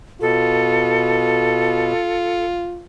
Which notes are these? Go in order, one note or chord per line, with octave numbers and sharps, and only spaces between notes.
B2 F4 A4